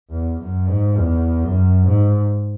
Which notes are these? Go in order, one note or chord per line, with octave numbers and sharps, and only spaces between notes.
E2
F#2
G#2
E2
F#2
G#2